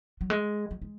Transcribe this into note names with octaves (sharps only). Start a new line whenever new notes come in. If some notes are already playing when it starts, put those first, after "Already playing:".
F#3
G#3
F#3
G#3